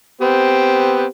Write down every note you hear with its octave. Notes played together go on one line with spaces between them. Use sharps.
B3 C4 G4